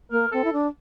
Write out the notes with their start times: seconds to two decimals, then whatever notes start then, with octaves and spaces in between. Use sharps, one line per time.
0.11 A#3 A#4
0.32 C4 A4
0.45 E4
0.53 D4